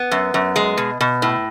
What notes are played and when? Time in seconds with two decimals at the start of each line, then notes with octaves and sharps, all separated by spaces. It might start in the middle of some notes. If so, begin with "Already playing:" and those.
Already playing: B3
0.11 F#2
0.34 F#2
0.56 G#3
0.77 B2
1.01 B2
1.22 A2